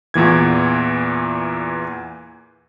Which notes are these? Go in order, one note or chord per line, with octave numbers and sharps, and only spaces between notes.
E2 A#2 E3 G#6